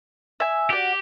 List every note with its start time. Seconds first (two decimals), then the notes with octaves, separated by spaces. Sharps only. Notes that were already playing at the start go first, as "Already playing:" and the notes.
0.40 E5 G#5
0.70 F#4 G4 D5